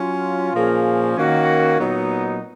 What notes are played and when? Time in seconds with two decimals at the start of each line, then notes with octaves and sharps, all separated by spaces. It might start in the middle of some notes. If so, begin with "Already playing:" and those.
Already playing: F#3 C#4 F4
0.53 A#2 F3 A#3 C#4 G#4
1.16 D#3 A#3 C#4 F#4
1.79 A#2 F#3 B3 D#4